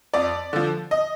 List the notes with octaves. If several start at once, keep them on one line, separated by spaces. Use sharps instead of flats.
F2 D5
D3 F3
D#5